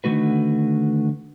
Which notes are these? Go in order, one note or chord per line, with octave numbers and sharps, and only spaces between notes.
D3 D#3 A3 F#4 B4